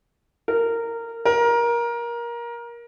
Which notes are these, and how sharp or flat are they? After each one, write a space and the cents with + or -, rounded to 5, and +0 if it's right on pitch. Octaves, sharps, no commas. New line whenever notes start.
A#4 -15
A#4 +20